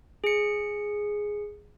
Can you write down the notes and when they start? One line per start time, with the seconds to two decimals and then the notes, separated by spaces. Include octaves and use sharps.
0.24 G#4 C#7